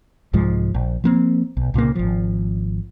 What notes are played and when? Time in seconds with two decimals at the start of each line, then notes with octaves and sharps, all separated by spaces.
0.33 C2 G#2 F3 G#3
0.74 A#1
1.04 F3 A#3 C4
1.57 B1
1.74 C2 A#2 C#3 A#3
1.95 G#1 F3